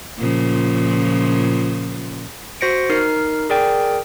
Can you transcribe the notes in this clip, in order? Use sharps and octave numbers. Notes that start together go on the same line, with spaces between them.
A#2 C#3 F3
F#4 C5 A#6 C#7 D7
D#4 A#4 F6 C7
G#4 A#4 D5 G5